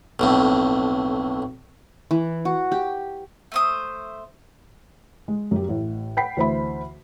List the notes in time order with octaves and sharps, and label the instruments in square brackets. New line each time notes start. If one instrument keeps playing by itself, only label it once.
[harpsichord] B1 F2 A2
[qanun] E3
F#4
G4
[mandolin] A3 C5 D#6
[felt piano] G#3
F#2 G4
A1 A2
F#5 G5 B5 B6 C7
D2 E3 C5 E5 B5